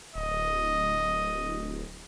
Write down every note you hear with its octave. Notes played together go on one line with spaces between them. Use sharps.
D1 D#5